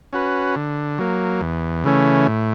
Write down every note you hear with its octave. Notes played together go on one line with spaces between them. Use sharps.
C#4 F#4 B4
D3
F#3 A#3
E2
C#3 E3 A3 C#4
A2